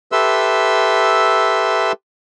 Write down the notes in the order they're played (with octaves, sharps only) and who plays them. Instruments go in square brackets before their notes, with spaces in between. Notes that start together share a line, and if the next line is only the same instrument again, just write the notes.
[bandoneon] G4 A4 B4 E5 C6 E6